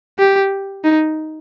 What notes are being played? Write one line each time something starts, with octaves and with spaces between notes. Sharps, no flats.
G4
D#4